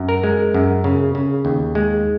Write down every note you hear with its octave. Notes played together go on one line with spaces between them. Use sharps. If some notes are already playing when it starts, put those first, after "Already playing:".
Already playing: F#2
A#4
G#3
F#2
C#3
C#3
D#2
G#3